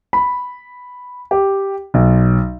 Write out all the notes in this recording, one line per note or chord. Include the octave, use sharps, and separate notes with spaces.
B5
G4
B1